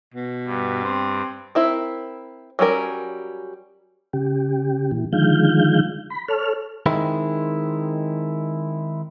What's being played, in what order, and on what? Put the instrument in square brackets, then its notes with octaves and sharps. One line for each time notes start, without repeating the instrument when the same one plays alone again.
[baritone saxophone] B2
[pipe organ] G2
[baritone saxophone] C4
[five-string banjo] C4 E4 A#4
F#3 G3 C#4 A#4
[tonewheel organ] C#3 G4
A#2 E3
D3 D#3 F3 G#3 F5 G6
B5
A4 C#5 F6
[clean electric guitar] D#3 G#3 C4 E4